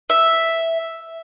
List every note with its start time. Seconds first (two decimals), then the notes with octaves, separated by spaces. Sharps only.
0.10 E5